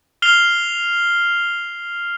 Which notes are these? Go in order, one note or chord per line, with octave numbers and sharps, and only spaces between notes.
F6 C7 F7 G7